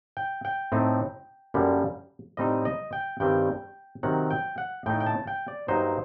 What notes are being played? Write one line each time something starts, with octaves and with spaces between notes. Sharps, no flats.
G5
G5
A2 A3 C4 D#4
F#2 D3 G3 A#3
A2 G3 C4 D#4 D#5
D#5
G5
G2 D#3 G3 C4 G5
C3 D#3 F#3 F#5
G5
F#5
A2 A3 D#4 G5
G5
A5
G5
D5
G2 F#3 A#3 D#4 C5